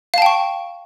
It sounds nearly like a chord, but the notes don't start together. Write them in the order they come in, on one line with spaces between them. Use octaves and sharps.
F5 A5 G5 C#6